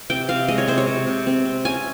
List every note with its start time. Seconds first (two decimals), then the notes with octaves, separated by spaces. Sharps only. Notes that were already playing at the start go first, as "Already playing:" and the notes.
0.10 C3 G5
0.29 C3 F5
0.48 G#3 D#5
0.58 C#5
0.68 C3 C5
0.78 C#5
0.87 C3
1.07 C3
1.26 C4
1.45 C4
1.65 C#4 G#5